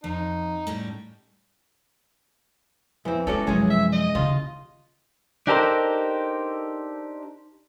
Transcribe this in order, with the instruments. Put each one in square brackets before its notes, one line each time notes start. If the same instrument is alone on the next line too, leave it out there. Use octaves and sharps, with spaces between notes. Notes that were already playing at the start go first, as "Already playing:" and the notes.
[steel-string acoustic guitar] F2 [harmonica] D#4
[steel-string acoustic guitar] A2 G3 C#4
[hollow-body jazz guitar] F2 C4 [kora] E3
[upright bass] G#3 [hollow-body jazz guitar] C#4 F#4 D5 [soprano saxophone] A4
[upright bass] F#2 F3 [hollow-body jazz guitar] C3 G#3 C#4 [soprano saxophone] G#4
[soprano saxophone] E5
D#5
[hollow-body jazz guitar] D#2 [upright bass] C#3 [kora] F4
[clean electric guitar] D4 D#4 G4 A4 A#4 C5